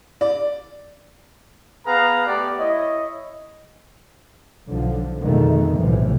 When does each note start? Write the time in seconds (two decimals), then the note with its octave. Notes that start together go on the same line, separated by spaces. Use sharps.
0.21 D5
1.87 B3 G#4 B4 F5 A#5
2.27 A3 B3 G4 D5
2.59 E4 C#5 D#5
4.68 B1 D3 F3
5.21 F2 B2 D3 D#3 G#3 A3
5.77 B1 A2 C3 E3 F3